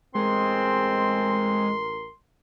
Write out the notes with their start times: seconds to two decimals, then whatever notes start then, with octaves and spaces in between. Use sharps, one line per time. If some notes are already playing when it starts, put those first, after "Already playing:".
0.15 A1 G#3 C4 A#4 C6